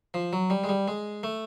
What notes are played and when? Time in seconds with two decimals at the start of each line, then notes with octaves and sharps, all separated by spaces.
0.14 F3
0.33 F#3
0.50 G3
0.64 G#3
0.69 G3
0.88 G#3
1.23 A3